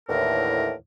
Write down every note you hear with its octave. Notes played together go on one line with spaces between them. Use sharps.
D#2 A2 D3 E3 A#4